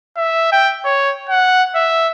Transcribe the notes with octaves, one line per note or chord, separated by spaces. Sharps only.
E5
G5
C#5
F#5
E5